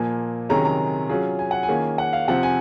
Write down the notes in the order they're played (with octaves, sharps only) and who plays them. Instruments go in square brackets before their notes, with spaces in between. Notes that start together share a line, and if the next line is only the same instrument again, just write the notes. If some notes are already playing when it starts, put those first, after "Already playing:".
Already playing: [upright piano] A#2 F3 A#3 [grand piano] G#5
[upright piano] C3 D#3 F#3 C#4 G#4 [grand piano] A#5
[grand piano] A#5
[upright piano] F#3 C#4 F4 G#4
[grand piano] G#5
F#5
G#5
[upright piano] D#3 A#3 C#4 F4 G#4
[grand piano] F#5
F5
[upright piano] C3 F3 C4 [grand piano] F#5
[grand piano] G#5